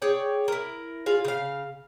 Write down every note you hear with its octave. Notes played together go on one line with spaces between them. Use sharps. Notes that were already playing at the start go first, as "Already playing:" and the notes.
G#4 C#5 D5 G5
E4 A#4
F4 G#4 F5
C#3 F5